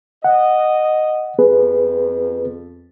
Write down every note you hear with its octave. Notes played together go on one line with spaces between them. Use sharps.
D#5 F#5
F2 B3 G#4 B4